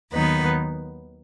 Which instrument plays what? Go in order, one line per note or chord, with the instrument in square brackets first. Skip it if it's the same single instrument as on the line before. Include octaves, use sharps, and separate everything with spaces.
[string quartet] D#2 D#3 F#3 B3 D#4 B4